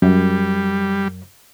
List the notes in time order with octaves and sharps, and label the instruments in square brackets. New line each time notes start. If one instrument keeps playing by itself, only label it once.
[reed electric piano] F#2 [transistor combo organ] G3